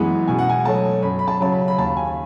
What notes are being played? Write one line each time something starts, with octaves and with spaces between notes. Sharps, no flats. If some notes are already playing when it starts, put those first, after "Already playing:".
Already playing: F#2 E3 G#3 B3
B2 G#5
F#5
G#5
F#3 A3 A5
F#2 B5
B5
A5
C#3 F#3 A5
B5
B5
D#2 A5
G#5